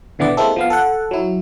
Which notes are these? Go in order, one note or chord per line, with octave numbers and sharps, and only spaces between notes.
B2 D3 E3 B3 D5
G#3 A#3 C4 E4 A4
F3 B3 F5
A4 F#5
F#3 E4